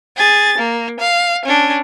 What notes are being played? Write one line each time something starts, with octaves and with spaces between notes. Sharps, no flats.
G#4 A6
A#3
F5
C#4 D4